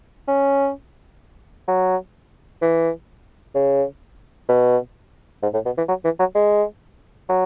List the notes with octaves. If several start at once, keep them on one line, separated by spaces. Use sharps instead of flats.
C#4
F#3
E3
C#3
B2
G#2
A2
B2
E3
F#3
E3
F#3
G#3
F#3